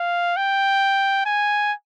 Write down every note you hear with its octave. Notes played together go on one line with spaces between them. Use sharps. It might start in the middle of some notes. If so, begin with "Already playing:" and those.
Already playing: F5
G5
G#5